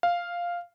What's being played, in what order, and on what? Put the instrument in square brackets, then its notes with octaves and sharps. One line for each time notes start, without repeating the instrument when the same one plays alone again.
[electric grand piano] F5